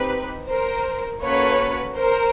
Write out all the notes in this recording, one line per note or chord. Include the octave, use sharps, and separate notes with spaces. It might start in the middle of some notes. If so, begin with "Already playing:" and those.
Already playing: C4 D#4 G4 B4
A#4 C5
A#3 C#4 F#4 A4 B4 C#5
A#4 C5